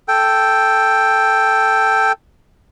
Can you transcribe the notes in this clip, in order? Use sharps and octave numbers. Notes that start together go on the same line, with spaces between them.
A4 G5